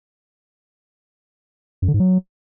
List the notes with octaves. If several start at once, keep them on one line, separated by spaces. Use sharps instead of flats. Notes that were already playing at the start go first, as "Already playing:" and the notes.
F#2
D3
G#2
F#3